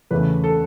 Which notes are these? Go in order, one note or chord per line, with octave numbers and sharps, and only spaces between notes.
E2 C#3 E3 A3 B4
A4